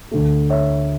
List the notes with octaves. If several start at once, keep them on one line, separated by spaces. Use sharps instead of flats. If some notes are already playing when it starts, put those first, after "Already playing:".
D2 D3 A3
C#5 E5